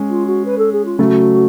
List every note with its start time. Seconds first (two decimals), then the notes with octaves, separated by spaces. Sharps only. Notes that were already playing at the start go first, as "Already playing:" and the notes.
Already playing: G#3 C#4
0.09 F4
0.26 F#4
0.45 B4
0.58 A4
0.72 G#4
0.85 F4
0.99 C#3 F#3 A3 F#4